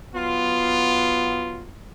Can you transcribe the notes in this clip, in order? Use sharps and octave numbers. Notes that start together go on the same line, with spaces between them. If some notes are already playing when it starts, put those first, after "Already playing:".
F#3 B3 F4